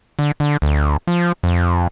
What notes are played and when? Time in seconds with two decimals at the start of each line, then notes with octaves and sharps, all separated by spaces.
0.19 D3
0.40 D3
0.62 D2
1.07 F3
1.43 F2